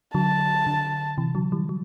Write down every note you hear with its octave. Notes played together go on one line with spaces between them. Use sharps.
D3 F#3 A5
D3
C3 E3
D3 F#3
E3 G3
F#3